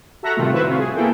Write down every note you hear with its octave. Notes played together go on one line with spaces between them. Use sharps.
F#4 A4 E5 F#5 A#5
A2 C3 D#3 G3 A3 F4
E4 F#4 B4 C5 E5
C4 F4 F#4 C#5
G#4
A#3 B3 E4 G#4 A4 G5